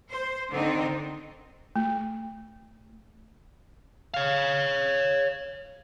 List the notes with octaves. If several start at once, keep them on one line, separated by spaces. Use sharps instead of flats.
C5
D3 D#3 C4 D#4
A3
C#5 F5